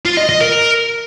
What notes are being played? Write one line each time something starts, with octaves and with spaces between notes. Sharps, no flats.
F4
D#5
D#5
A#4